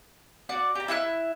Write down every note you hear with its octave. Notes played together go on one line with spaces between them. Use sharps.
F#4 D5
G4 A#5
E4 E5 C#6 F#6